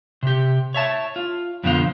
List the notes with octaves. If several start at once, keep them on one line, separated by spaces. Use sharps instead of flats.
C3 G4
C#5 E5 A5
F4
F2 B2 D3 F3 E4 F4